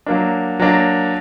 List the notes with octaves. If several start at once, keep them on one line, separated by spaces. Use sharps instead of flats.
F#3 A#3 D4
F#3 A#3 D4